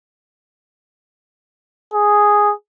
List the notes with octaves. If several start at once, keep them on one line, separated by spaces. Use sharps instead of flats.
G#4